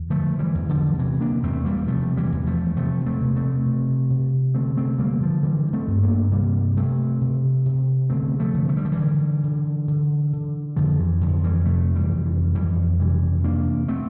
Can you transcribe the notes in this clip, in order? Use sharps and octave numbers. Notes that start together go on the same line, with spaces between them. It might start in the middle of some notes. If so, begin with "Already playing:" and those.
Already playing: E2
D3 F3 A3
E3 G3
E2
D3 F3
C3 E3
A#3 D4
E2 A3 C4
G3 A#3
C3 F3 A3
E3 G3
E2
F3 A3
C3 F3 A3
A3 C4
C3
A3 C4
C3
C3
D3 A3 C4
A3 C4
D3 G3 A#3
D3 F3
D3 E3 G3
A3 C4
G2
A#3 D4
C3 G3 A#3
C3 A3 C4
C3
C3
D3 A3 C4
F3 A3
D3
A3
G3
F3
E3 G3
D3
D3
D3
D3
F2 D3 F3
E3
F2 D3 F3
F3
E3 G3
C3 F3 A3
E3 G3
F2
E3
F2 E3 G3
C3 E3 G3
E2 A#3 D4
A3 C4